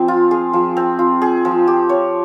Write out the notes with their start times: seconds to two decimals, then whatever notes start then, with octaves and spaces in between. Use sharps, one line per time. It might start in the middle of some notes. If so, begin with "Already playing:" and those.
Already playing: F3 C4 G#4
0.08 F4
0.31 G#4
0.53 F3
0.77 C4
0.99 F4
1.22 G#4
1.45 F3
1.67 G4
1.89 C#5